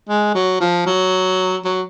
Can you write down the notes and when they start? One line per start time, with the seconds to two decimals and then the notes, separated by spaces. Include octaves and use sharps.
0.09 G#3
0.34 F#3
0.61 F3
0.86 F#3
1.65 F#3